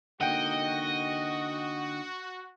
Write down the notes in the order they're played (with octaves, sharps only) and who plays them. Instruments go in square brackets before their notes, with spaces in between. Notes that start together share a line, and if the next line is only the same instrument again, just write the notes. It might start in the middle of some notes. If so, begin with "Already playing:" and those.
[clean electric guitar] D3 A#3 D#4 [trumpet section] F#4 [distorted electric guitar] D#5 [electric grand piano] F#5 G5